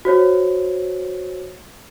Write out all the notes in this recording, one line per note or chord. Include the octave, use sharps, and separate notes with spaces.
F#4 C5 C#5